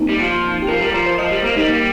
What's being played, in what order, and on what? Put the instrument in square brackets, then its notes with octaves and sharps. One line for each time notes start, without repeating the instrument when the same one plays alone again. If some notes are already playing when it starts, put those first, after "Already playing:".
Already playing: [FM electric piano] A#3 C4 D#4
[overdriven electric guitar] G3
F3
[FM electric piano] G4
[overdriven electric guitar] F3 [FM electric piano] A#4
[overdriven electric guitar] G3 [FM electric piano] A#4
[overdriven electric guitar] F3 [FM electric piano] A#4
[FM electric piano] C5
[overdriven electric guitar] F3 [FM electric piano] D#5
[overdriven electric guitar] G3
[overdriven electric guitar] A#3 [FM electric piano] A#4
[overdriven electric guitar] G3 [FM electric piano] D#4
[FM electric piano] A#3